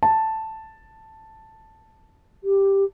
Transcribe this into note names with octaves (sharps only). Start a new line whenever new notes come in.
A5
G4